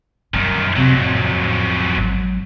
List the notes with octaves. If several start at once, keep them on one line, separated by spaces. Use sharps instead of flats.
F#2 D#3 G3
F2 C3 F#3 C4
A1
G#1 F#3